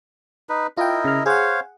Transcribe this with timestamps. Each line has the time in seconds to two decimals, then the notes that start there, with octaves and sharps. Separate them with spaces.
0.49 D#4 B4
0.77 E4 F4 A#4 D#5 G5
1.05 C#3 F6
1.26 G#4 C5 C#5 F5 F#5